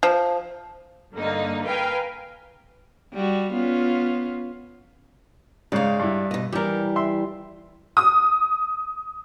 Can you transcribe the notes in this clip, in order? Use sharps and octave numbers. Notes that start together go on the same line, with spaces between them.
F3
G2 D3 A#3 D#4
A#4 B4 F5 G5 G#5
G3 F#4
B3 C#4 F4
G#2 C#3 D5 F5
G2 E4
B2 D#5
E3 G3 G4 A#4
E5 C6
D#6